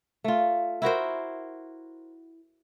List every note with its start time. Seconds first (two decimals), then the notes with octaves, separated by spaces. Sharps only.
0.24 A3 F4
0.82 E4 F#4 A#4 C5